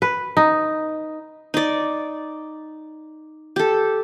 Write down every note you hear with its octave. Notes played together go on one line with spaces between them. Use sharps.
B4
D#4
D#4 D5
G4 A4